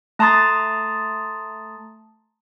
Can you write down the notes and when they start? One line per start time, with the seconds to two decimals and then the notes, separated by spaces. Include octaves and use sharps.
0.19 A3 A5 A#5 C6 D#6 A6